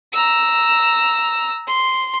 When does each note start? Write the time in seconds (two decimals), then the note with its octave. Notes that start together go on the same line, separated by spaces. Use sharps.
0.13 A#5 E6
1.67 C6